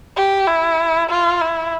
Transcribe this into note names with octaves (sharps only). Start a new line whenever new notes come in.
G4
E4
F4
E4